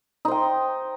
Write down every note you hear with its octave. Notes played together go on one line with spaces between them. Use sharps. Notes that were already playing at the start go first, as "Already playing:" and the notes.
D#4 C5 G5